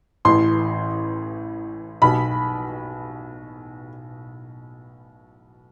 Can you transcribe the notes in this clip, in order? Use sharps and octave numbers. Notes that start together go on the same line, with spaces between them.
A1 A2 E3 C6
B1 B2 B5